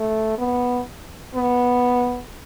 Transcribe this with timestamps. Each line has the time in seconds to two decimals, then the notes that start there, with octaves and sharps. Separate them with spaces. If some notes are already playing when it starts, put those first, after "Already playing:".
Already playing: A3
0.38 B3
1.35 B3